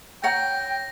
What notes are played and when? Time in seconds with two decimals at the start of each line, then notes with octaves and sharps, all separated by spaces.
0.24 C#5 F#5 G5 A#5 A#6